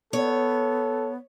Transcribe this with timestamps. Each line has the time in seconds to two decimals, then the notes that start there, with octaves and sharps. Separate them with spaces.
0.13 B3 A4 C#5